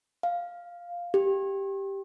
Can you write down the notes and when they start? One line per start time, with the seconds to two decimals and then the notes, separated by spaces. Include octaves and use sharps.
0.23 F5
1.14 G4